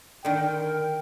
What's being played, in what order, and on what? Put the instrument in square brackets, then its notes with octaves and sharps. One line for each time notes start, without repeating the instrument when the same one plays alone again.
[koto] D3 D#3 [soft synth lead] A#4 [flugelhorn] G5